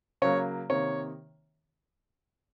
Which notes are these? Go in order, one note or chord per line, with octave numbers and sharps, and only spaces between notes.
C#3 F#3 A#3 C#5
C3 D#3 A#3 C#5